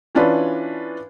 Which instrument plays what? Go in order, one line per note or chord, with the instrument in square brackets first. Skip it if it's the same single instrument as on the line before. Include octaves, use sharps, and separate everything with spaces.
[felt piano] E3 C#4 D4 F4 B4